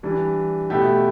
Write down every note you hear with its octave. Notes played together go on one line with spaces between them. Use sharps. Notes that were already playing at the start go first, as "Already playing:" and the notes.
E3 G3 D4
B2 A3 E4 G4